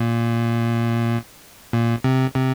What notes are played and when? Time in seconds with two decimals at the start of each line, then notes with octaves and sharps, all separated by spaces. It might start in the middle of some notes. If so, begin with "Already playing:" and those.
Already playing: A#2
1.73 A#2
2.04 C3
2.36 C3